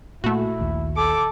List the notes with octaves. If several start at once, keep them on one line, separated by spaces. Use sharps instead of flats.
A#2 A3 E4 F#4
A#1 D#2
A4 D6